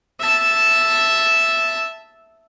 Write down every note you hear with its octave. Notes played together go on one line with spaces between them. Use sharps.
E5 A5